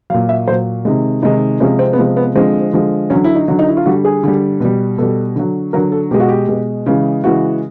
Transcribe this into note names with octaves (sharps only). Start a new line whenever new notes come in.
A#2 F#3 F5
E5
A#2 F#3 C5
C3 D#3 G#3
C3 D#3 G#3 D#4
C3 F3 G#3 C#4
C4
B3
C3 F3 G#3 C4
B3
D3 F3 G#3 C4
D3 F3 G#3
D3 F#3 C#4
E4
D#4
D3 F#3
D#4
E4
F4
D3 G3 F#4
G#4
D3 G3
B2 G3
B2 G3 A4
D3 F#3
D3 F#3 A#4
A4
B2 G#3 G4
F#4
G4
B2 G#3
C#3 E3 G#3
C#3 E3 G#3 F#4